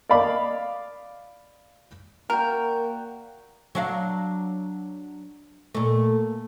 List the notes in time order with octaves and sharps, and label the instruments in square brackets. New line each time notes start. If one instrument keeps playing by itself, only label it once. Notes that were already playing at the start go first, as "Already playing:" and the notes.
[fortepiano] D5 D#5 F5 B5 D6
[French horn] A#3 [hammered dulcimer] F#4 D5 G5 [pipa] A#4
[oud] F#3 D4 F5
A#2 A3